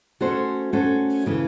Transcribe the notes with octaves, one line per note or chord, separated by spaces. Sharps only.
A3 C#4 F#4 A4 C5
A3 C#4 F#4 A4 C5
C#3 E3 A3